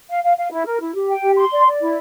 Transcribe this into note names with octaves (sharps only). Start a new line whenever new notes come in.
F5
F5
F5
E4
A#4
E4
G4
G5
G4
C6
D5
D5
E4